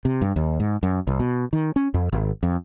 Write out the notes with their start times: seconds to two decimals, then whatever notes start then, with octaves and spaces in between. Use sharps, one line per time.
0.05 C3
0.21 G2
0.36 D#2
0.60 G#2
0.83 F#2
1.07 C2
1.20 B2
1.53 D#3
1.76 C#4
1.94 F2
2.12 G#1
2.43 F2